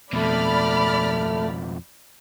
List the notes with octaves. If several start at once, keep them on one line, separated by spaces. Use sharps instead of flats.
F2 B2 A3 D5 B5 F6